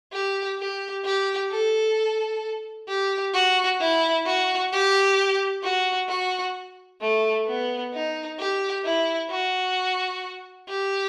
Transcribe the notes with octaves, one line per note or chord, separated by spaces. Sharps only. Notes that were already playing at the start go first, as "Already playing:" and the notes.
G4
G4
G4
A4
G4
F#4
E4
F#4
G4
F#4
F#4
A3
B3
D#4
G4
E4
F#4
G4